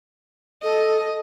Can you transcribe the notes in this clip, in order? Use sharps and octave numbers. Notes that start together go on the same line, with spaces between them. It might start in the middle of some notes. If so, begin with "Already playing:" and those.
A4 D#5